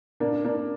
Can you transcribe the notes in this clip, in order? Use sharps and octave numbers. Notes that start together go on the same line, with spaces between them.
A#2 A#3 D4
A#3 D4